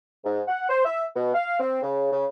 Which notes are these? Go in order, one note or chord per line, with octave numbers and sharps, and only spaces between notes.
G#2
F#5
C5
E5
B2
F5
C4
C#3
C#3